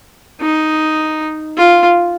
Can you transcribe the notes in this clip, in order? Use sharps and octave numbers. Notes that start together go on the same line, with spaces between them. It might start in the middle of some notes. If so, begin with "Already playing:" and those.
D#4
F4